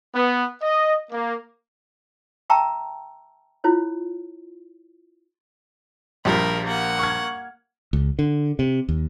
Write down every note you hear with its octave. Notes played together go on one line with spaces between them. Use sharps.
B3
D#5
A#3
E5 G5 A5 A#5 C#6 E6
E4 F4 C5 C#5
A#1 F3 G3 A#4 B5
A#3 F#5
C#6 F6 G#6
C#2
D3
C3
D#2